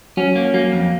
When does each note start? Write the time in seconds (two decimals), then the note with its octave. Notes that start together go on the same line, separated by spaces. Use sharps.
0.17 F#3 C#4 F#4
0.36 A#3
0.54 F#3 A#3 F#4
0.72 F2